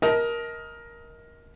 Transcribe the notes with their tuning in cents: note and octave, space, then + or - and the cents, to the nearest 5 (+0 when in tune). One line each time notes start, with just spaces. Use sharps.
A#4 +15 D#5 +30 A5 -5